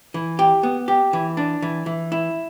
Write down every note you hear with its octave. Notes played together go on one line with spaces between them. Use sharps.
E3
G4
B3
G4
E3
D4
E3
E3
E4